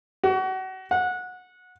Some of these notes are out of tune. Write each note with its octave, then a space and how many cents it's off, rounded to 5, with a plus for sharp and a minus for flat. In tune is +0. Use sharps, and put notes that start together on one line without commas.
F#4 +30
F#5 -20